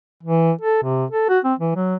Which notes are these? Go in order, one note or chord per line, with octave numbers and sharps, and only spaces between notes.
E3
A4
C3
A4
F#4
C4
E3
F#3